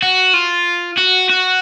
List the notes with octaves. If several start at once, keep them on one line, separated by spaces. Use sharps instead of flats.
F#4
F4
F#4
F#4